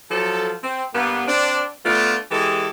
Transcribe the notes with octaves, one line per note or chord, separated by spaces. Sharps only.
F3 F#3 A4
C4
G2 A#3 B3
C4 D4
A3 B3 D4 F4
E3 G#3 G4 A4